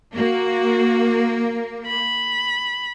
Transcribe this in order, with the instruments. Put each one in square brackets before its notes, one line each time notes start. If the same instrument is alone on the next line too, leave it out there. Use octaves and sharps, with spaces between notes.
[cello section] A#3 [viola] F#4
[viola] B5